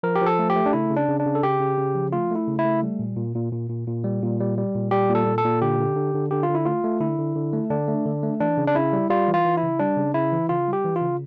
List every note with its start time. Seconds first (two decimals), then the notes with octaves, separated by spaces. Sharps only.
0.03 F3 A#4
0.15 G4
0.21 F3 A4
0.39 A3
0.50 G4
0.56 A3
0.66 D4
0.73 C#3 E4
0.91 C#3
0.96 D4
1.08 C#3
1.20 D4
1.26 C#3
1.35 A4
1.43 C#3 G4
1.60 C#3
1.78 C#3
1.95 F3
2.12 A3 F4
2.31 A3 E4
2.48 C#3
2.59 E4
2.65 A3
2.83 G3
2.99 A#2
3.17 A#2
3.35 A#2
3.52 A#2
3.70 A#2
3.87 A#2
4.04 G3
4.23 A#2
4.40 G3
4.58 G3
4.75 A#2
4.91 G3 G4
5.10 A#2
5.15 A4
5.27 A#2
5.38 A4
5.45 A#2
5.62 D3 G4
5.79 D3
5.96 D3
6.14 D3
6.31 D3 G4
6.43 F4
6.49 D3
6.55 E4
6.66 A3 F4
6.84 A3
7.00 D3 E4
7.19 D3
7.36 D3
7.53 A3
7.70 D3 D4
7.88 A3
8.06 D3
8.23 A3
8.40 E3 D4
8.58 C#3
8.67 D4
8.75 C#3 E4
8.93 G3
9.10 G3 F4
9.28 E3
9.34 F4
9.45 E3
9.57 E4
9.63 C#3
9.79 G3 D4
9.97 C#3
10.14 C#3 E4
10.32 E3
10.49 C#3 F4
10.68 G3 G4
10.84 E3
10.96 F4
11.02 C#3